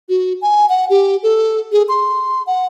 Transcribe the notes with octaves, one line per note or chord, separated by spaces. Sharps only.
F#4
G#5
F#5
G4
A4
G#4
C6
F#5